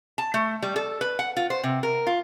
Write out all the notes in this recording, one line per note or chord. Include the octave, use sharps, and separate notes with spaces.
A5
A3
G3
A4
B4
F#5
F4
C5
C3
A#4
F4